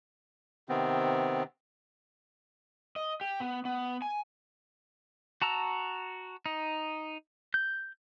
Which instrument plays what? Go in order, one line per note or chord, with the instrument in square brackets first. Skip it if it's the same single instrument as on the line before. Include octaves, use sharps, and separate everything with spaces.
[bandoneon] C3 D#3 B3 C4
[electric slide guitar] D#5
G4
B3
B3
G#5
[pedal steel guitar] F#4 A5 A#5 E6
D#4
G6